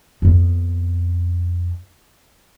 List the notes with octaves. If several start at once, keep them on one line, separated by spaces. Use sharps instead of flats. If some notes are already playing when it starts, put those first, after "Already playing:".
F2 B3